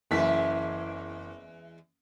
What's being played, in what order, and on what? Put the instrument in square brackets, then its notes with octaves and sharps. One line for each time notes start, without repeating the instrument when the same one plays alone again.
[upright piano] F#1 E3 B6 [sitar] E2 G#3 E5